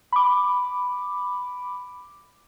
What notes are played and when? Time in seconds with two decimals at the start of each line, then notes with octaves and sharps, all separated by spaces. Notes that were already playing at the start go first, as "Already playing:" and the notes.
0.12 B5 D6